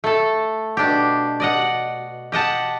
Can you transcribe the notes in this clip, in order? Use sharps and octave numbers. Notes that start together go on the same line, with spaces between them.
A3 A4
B2 D4 G4
D5 D#5 F#5
G4 D#5 F#5 A5